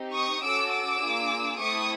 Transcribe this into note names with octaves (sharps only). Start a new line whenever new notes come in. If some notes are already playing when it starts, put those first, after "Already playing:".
Already playing: C4 D#4 G4
C#6 D#6
C#4 F#4 A4 D6 E6
D6 E6
A#3 D4 F4 G#4
A3 C4 E4 A4 C#6 D#6